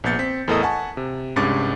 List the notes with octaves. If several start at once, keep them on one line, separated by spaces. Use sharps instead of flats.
A#1 B3 G6 A6 C#7
C4 B6
E2 A2 A4 A#4 D#5 D#6
F#5 G#5 A5 C#6
C3
C2 G2 G#3 C#4 D6 A6